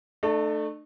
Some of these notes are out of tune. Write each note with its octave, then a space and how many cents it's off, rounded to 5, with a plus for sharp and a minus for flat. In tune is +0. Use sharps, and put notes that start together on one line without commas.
A3 +0 D4 +45 A4 +0